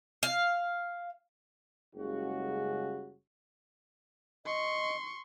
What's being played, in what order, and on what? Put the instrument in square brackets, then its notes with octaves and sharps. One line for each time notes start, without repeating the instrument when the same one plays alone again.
[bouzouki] F5
[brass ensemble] F#1 C#3 G3 G#3 F#4
[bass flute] D#5 [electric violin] C6 C#6